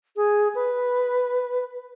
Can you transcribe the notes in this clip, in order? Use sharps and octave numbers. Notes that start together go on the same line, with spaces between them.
G#4
B4